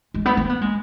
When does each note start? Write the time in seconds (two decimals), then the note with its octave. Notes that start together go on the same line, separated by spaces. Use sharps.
0.14 G#3
0.26 B3
0.37 C4
0.50 B3
0.62 G#3